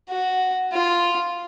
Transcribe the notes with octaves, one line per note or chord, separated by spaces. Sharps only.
F#4
F4